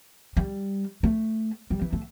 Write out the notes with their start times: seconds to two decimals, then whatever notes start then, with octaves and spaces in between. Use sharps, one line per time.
0.37 G3
1.03 A3
1.70 G3
1.82 E3
1.93 A3